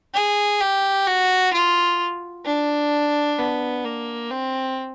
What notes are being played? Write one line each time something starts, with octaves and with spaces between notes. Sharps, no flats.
G#4
G4
F#4
F4
D4
B3
A#3
C4